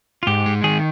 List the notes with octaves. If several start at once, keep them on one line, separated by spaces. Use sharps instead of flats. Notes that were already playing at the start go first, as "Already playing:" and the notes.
F4
G#2 G4
G#3
D#3 G#4